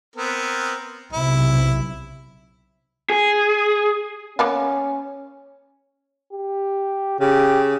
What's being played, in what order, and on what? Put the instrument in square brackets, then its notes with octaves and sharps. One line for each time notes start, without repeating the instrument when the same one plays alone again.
[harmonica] B3 C4 A#4
[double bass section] B1 C3 [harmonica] E4
[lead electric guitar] G#4
[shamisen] A#3 B3 F4 [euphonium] C#4
[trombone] G4
[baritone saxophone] C#3 [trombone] G4